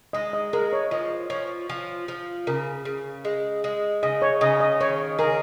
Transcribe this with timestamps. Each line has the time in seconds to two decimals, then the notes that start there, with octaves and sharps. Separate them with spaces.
0.13 G#3 D#5
0.33 D#5
0.53 G#3 A#4
0.73 C#5
0.91 F3 D#5
1.30 F3 C#5
1.69 F3
2.08 F3
2.47 C#3 A#4
2.85 C#3
3.25 G#3
3.64 G#3
4.03 C#3 D#5
4.22 C#5
4.41 C#3 D#5
4.60 D#5
4.81 D#3 C#5
5.19 G#4 A#4